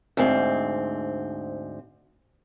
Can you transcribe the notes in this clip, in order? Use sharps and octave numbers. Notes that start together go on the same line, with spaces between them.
D2 G#2 C4